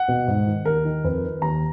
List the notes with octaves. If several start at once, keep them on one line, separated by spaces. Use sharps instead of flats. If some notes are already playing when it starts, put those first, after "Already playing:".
Already playing: F#5
B2
G#2
D#3
D#2 A#4
D#3
F2 B4
D#3
D#2 A#5